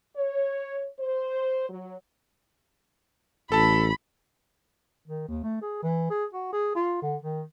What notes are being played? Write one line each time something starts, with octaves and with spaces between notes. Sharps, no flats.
C#5
C5
F#3
A1 A4 A5 B5
D#3
D#2
A3
G#4
E3
G#4
F#4
G#4
F4
D3
D#3